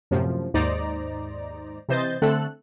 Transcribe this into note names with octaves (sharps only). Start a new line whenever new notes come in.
F#2 A2 C3 F3
D#2 G#2 D#4 C5 D5 A#5
C3 E3 C5 D#5 G6 A6
D3 A3 C4 A4 F#6